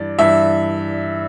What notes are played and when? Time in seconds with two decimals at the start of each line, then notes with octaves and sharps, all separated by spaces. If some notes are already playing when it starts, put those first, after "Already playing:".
Already playing: G2 E3 D5
0.18 G2 E3 E5